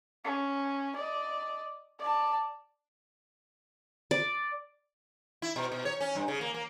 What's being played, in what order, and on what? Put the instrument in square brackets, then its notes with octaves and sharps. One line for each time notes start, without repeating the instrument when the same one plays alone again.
[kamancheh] C#4
D5 D#5
D5 A5
[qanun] D5
[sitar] E4
B2
B2
C#5
C#4
G2
C#3
A#3
A#3